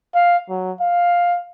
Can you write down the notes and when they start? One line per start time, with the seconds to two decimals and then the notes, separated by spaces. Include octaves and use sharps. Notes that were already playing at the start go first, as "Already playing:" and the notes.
0.15 F5
0.50 F#3
0.81 F5